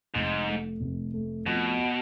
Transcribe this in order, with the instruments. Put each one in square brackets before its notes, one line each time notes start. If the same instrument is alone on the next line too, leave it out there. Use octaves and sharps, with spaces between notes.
[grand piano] F1 [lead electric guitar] G#2
[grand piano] A3
F1
A3
[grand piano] F2 [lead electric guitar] B2